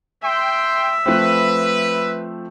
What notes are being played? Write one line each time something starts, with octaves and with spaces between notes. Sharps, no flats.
E5 G5 C6
F3 A3 C4 B4